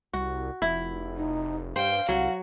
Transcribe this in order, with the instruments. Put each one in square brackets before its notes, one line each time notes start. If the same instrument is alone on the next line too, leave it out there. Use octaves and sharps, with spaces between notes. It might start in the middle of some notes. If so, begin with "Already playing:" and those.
[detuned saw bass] C2 [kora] F#4
[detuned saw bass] F1 [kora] E4
[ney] D#4
[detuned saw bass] G2 [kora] C5 [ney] F5 [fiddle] G5
[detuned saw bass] C2 [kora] F#3 [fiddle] F#4